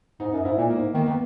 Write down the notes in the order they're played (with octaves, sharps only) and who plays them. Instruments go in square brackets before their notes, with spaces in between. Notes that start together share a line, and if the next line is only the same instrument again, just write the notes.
[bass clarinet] G#2 [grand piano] D#4
[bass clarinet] F#2 [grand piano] D#4
[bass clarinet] G#2 [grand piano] E4
[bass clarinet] A#2 [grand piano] A#3
[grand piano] A#3
[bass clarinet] G#2
[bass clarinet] D#3 [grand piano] A#3
[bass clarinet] D#3 [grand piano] B3